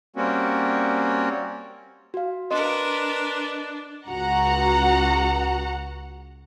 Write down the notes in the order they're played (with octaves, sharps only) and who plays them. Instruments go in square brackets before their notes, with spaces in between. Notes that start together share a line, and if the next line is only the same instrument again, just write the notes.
[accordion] G3 A#3 C4 C#4 F#4
[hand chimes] F#4 F5
[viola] D4 [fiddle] A#4 B4 [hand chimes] D#5 C6
[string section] C#2 F#4 F#5 A#5